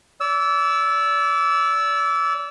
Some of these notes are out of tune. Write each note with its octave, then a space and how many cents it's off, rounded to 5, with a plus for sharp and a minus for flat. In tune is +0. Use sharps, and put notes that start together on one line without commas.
D5 -35 E6 +0